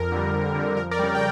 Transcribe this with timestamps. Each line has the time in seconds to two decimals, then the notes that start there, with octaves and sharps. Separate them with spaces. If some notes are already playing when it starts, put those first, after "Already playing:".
Already playing: F2 A#4
0.12 D3 G3
0.33 F2
0.55 D3 G3
0.77 F2 A#4
0.91 A#4 D5
0.99 C#3 G3
1.15 G5